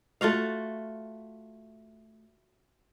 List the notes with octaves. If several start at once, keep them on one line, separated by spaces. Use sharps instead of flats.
A3 F4 F#4 F5